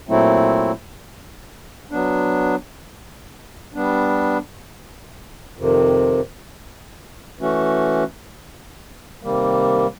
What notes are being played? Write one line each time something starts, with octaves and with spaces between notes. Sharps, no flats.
A#2 F#3 A3 C4 E4
F#3 B3 D4
G3 B3 D4
F2 C3 D#3
E3 A3 C#4 F#4
C3 D#3 G3 A#3